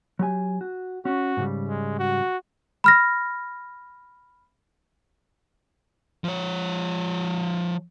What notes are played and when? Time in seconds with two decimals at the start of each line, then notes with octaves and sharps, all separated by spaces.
0.19 F#3 G4 G#5
0.61 F#4
1.05 C#4 F#4
1.37 G#2 C#3 G3
1.69 G#3
1.99 F#4
2.84 B5 F6 A#6
6.24 F3 C#5